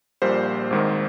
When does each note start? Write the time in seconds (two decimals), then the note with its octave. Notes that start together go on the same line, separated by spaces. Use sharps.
0.22 A#1 A#2 G3 A#3 C5
0.71 G#1 G#2 D#3